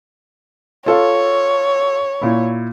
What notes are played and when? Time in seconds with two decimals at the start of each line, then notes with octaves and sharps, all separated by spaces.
0.86 F4 A4 C#5 F5
2.22 A#2 E4